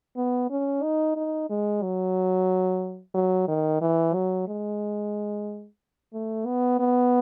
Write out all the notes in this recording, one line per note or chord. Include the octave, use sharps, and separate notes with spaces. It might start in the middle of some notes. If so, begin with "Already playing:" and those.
B3
C#4
D#4
D#4
G#3
F#3
F#3
D#3
E3
F#3
G#3
A3
B3
B3